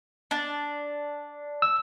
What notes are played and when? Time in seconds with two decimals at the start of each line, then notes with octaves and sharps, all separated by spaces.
0.31 D4
1.62 E6